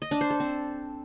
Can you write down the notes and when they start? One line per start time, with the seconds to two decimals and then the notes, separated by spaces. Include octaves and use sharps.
0.02 D#5
0.11 D4
0.21 C5
0.30 A4
0.40 C4